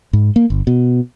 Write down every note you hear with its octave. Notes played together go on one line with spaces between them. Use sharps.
G#2
A#3
G1
B2